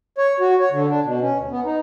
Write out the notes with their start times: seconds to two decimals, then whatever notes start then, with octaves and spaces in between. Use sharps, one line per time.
0.18 C#5
0.40 F#4
0.60 C#5
0.72 D3
0.88 D4
1.04 B2
1.21 C#4
1.38 D2
1.51 B3
1.65 D#4